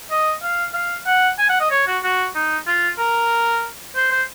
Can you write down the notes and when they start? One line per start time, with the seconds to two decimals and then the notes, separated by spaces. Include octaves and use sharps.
0.11 D#5
0.43 F5
0.74 F5
1.07 F#5
1.39 G#5
1.49 F#5
1.60 D#5
1.71 C#5
1.87 F#4
2.03 F#4
2.35 D#4
2.67 F4
2.99 A#4
3.95 C5
4.11 C5